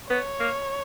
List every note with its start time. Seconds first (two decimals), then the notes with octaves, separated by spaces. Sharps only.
0.10 B3 C#5
0.40 A#3